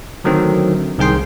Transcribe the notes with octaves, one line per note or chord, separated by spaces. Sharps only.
D3 D#3 F#3 A3 C4
C2 D#3 G#4 G5 C6